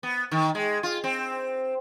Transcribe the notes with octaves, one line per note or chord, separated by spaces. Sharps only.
B3
D#3
G#3
F4
C4